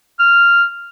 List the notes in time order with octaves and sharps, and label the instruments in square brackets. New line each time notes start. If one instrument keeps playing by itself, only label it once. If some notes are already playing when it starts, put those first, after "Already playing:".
[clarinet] F6